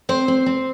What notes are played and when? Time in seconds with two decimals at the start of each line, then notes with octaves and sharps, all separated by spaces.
0.09 C4 C5
0.28 C4
0.46 C4